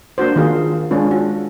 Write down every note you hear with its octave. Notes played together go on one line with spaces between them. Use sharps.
A#3 D4 F#4 C5
D#3 A#3 F4 F#4 G#4
G#3 C#4 D4 F4 B4
F#4